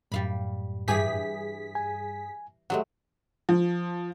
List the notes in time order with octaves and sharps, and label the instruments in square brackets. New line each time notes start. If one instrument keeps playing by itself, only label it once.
[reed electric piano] F#2 A2 [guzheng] G3 F5 B5
[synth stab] G2 G#4 B6 [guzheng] E3 G4
[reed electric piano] G#5
[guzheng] F#3 G#3 A3 [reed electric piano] G4 F#5
[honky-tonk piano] F3